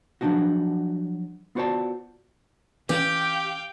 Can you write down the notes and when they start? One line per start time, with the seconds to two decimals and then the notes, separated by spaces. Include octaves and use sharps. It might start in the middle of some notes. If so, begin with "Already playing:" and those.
0.21 F3 F#3 D4 D#4 F#4
1.55 B3 F4 F#4 C5 D5 A5
2.89 E3 C#4 G4 F5 G5